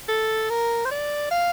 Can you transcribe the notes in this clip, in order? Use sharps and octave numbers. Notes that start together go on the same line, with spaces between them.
A4
A#4
C5
D5
F5